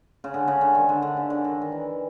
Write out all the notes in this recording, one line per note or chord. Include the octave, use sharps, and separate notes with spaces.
C#3
D3
C#3
D3
D#3
D3
D3
C#3
D3
D#3
D#3
E3